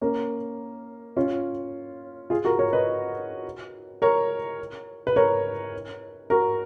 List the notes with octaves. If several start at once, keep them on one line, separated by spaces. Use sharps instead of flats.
A#3 C#4
C#4 F4
F4 G#4
F#4 A#4
A#4 C#5
B4 D#5
A#4 C#5
B4
A#4 C#5
F#4 A#4